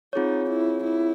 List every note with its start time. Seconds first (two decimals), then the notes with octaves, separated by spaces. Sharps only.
0.13 C4 D#4 F4 G#4 C#5
0.50 E4
0.84 E4